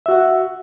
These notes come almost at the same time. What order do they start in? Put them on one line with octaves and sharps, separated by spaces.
E5 F#4 F#5